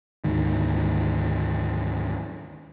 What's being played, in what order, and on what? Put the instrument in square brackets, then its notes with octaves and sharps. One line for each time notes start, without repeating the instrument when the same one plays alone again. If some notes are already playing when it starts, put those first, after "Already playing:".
[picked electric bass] D2 G#2 D#3